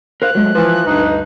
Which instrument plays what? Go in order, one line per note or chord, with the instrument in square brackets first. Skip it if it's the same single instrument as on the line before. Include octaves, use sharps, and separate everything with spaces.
[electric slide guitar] A#4 C5 F5 [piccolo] F#6
[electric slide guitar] F#3 G#3 A3
[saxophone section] E3 F3 [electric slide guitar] B4
[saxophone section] D2 G2 D#4